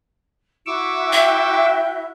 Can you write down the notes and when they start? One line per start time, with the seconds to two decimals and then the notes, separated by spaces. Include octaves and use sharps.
0.66 E4 F#4 C#6 D6 E6
1.13 E5 G5